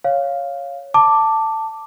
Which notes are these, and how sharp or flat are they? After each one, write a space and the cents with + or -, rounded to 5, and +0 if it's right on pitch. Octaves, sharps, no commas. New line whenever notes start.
C#5 +0 F5 +0
A5 +10 D6 +0